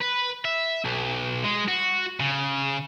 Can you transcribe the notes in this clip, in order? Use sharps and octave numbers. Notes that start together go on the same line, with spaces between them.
B4
E5
B1
G#3
F#4
C#3